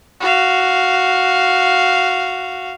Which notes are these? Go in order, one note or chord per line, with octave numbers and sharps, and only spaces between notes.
F#4 F5